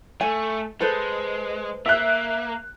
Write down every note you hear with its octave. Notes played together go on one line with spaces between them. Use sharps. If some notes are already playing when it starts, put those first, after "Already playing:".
A3 G#5
G#3 A4 B4 C5
A#3 E5 F#6